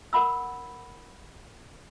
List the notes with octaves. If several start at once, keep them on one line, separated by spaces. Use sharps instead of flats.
A#4 F#5 B5 E6